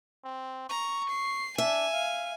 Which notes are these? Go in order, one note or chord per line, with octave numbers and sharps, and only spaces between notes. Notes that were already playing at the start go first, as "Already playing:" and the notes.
C4
A#5 C#6
C7
D4 E5 G#5
F5